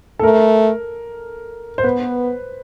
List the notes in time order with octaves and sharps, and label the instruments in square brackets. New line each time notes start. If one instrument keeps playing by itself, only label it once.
[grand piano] A4
[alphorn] A3 [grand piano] A#4
[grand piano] C5
[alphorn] B3 [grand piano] B4